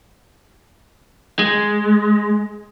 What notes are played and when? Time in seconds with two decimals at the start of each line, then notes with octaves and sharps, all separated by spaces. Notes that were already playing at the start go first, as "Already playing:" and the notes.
1.39 G#3